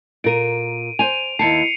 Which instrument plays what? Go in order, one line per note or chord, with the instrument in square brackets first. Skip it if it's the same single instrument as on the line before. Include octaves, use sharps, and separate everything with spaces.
[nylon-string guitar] A#2 A#4 [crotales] D7 D#7
[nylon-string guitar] C5 G#5 [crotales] D#7 F7
[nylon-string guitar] D#2 E4 A5 [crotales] C7 C#7